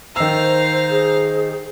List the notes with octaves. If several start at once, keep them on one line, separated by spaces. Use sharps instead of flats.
D#3 C5 F5 A#5 E6
G#4